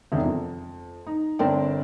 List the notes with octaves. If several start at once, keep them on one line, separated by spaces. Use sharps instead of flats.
E1 C3 D#3 D4
F2
D#4
G1 C4 D4 A#4 D5 G5